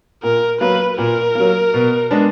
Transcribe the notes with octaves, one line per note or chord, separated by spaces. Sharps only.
A#2 A#4
F#3 A#3 B4
A#2 A#4
F#3 A#3
B2
G#3 B3 D4